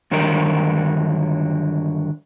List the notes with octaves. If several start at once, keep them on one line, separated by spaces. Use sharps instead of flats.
G2 D3 D#3 F#3 A#4